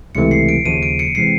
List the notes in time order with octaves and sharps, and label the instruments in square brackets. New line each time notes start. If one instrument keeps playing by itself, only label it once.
[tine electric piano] C#2 C3 E3 A3 [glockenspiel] C#7
[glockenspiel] C7
D7
[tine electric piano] D#2 C#3 F3 [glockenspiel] D#7
[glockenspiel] D7
C#7
[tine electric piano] C3 E3 G#3 C4 [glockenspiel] C7